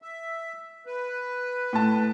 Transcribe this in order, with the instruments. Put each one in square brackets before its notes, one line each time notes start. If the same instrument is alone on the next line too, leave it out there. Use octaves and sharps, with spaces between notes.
[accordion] E5
B4
[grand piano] A2 A5